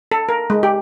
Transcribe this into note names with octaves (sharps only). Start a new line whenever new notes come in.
A4
A#4
G#3
G4